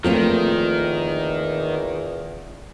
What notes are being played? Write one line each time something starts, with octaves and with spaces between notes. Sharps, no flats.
E2 D#3 F3 A3 A#3 C4 F4